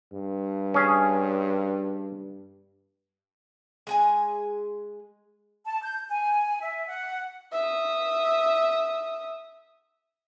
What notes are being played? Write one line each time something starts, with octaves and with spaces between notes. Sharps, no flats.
G2
C#4 G#4
G#3 G#4 G#5
A5
G6
G#5
E5
F#5
E5 D#6